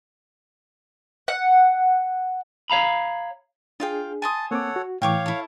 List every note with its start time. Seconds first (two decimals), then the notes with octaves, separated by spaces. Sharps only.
1.28 F#5
2.70 C#5 F5 A#5 B5
3.80 D4 F4 G#4 F5 G5
4.22 G#5 A5 C6 D#6
4.51 A#3 C4 A4 C#5 F#5 D6
4.76 F#4
5.02 A2 E3 C#5 F5 G5 C#6 D6
5.26 E4 A4